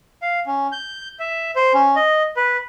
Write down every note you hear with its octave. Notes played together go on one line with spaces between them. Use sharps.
F5
C#4
G6
E5
C5
C#4
D#5
B4